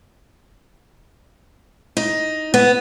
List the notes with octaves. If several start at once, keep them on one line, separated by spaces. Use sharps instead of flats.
D#4
B3